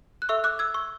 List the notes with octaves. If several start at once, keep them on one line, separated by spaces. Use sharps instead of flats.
F#6
A4 E5 C#6 E6
D6 F#6
E6 G#6
C#6 E6